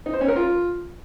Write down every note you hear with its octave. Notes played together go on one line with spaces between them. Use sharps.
D#4
C5
C#4
A#4
F4